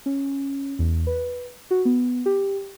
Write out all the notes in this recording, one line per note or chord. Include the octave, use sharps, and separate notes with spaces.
C#4
E2
B4
F#4
B3
G4